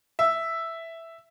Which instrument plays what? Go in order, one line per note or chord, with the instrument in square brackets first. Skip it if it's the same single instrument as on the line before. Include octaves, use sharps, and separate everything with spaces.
[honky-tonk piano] E5